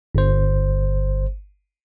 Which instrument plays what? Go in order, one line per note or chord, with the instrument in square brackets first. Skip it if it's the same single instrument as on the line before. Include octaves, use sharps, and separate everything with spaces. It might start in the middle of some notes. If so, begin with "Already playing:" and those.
[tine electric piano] G1 C5